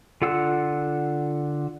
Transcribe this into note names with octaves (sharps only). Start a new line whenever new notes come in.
D3 F4 F#5 E6